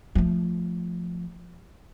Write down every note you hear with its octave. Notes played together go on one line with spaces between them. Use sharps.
F3 A3